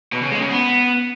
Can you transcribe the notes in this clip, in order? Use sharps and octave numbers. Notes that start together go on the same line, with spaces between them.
B2
C#3
G#3
C#3
B3